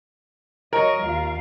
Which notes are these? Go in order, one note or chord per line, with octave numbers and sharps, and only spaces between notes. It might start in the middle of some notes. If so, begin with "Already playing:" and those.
F#3 A#4 C#5 D#5
D#2 F4 F5